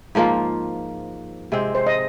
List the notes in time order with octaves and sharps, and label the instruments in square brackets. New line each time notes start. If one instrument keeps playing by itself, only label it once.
[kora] G#2 F3 A#3 F4
C3 G#3 C4
[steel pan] C5
D#5